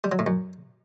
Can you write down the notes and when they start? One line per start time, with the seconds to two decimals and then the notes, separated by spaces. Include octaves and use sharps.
0.04 G3
0.12 F#3
0.19 A2
0.27 F#2